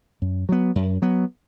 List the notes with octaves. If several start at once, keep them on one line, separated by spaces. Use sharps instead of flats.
F#2
F#3 B3
F#2
F#3 B3